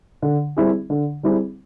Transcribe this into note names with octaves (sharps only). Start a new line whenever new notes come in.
D3
G3 C4 E4 G#4
D3
G3 C4 E4 G#4